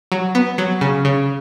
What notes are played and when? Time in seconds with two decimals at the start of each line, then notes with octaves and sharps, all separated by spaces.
0.12 F#3
0.35 B3
0.58 F#3
0.81 C#3
1.05 C#3